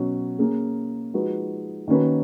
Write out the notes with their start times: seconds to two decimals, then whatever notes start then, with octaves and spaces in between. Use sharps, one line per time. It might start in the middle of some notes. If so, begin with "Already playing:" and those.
Already playing: B2 F#3 C#4 F#4
0.39 A#3 C#4 G#4
1.14 F3 G#3 D#4 F#4 B4
1.88 D#3 A#3 C#4 F#4 B4